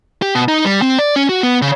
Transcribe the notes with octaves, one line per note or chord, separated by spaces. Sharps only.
G4
B2
D#4
G3
C4
D5
C#4
F#4
B3
C#3